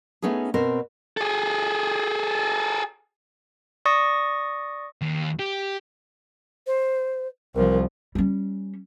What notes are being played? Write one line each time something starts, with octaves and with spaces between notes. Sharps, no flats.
A3 B3 C#4 D#4 G#4
B2 C4 A#4 C5
G#4 A4
D5 C#6 D#6 A#6
D#2
G4
C5
C2 F3 A#4
G3 C#4